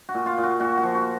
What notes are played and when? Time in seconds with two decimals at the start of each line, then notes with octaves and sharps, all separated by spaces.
0.09 F#4
0.14 A#2
0.26 F4
0.38 A#2
0.43 F#4
0.60 A#2 F#4
0.77 F#4
0.83 F3
0.95 F#4